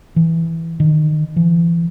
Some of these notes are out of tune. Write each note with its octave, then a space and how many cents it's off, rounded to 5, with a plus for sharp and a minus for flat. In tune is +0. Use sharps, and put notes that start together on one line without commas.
E3 +0
D#3 -25
E3 +40